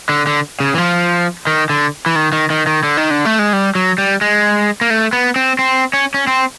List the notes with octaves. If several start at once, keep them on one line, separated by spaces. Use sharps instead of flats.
D3
D3
C#3
E3
F3
D#3
D3
E3
D#3
D#3
D#3
D#3
D3
D#3
D3
A3
G#3
G3
F#3
G3
G#3
A#3
A3
B3
C4
C4
C#4
C#4
C4